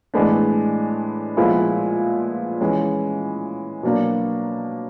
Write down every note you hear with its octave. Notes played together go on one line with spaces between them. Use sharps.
A2 E3 G#3 B3 D4
A#2 F3 G#3 B3 E4
E3 G#3 C#4
B2 F#3 A#3 D4